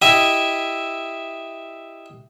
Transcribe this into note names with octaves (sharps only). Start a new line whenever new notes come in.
E4 G4 D#5 E5